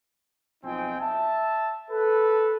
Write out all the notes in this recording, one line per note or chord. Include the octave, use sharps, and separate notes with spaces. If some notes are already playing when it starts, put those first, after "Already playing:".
B1 F3 C4 D#4 G5 G#5
E5 A5
A4 B4